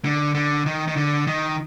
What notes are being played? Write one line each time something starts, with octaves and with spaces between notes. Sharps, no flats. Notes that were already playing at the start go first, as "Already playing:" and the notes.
D3
D3
D#3
D#3
D3
D#3